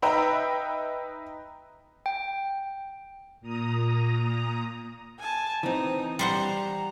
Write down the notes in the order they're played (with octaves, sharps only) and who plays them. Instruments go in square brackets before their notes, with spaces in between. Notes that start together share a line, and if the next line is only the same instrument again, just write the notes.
[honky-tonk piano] D#4 B4 D#5 E5 G5 A#5
[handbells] G5
[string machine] A#2 A#5 D#6
[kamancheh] G#5 A5
[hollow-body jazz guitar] E3 C4 [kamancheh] D#4 D#6
[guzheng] G3 C5 F#5 [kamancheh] A#5